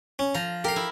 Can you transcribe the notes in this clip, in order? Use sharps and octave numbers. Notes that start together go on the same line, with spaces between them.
C#4
F3 A#5
G4 A#4 F5
E4